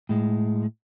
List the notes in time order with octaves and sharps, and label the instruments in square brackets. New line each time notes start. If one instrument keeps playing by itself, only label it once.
[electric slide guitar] A2 G#3